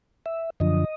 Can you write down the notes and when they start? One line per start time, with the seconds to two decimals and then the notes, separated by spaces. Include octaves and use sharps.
0.26 E5
0.60 F#2 D3 F3 D#5